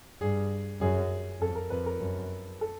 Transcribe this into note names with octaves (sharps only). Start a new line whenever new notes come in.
G2 G#4
F#2 G#4
F2 A4
A#4
F2 B4
A#4
F#2
A4